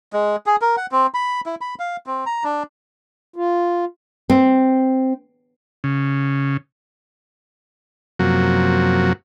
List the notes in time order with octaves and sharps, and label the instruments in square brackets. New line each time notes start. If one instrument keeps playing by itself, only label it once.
[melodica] G#3
G#4
A#4
F#5
C4
B5
E4
B5
F5
C4
A#5
D4
[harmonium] F4
[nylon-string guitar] C4
[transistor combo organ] C#3
F#2 C3 F3 F#3 A#3 F#4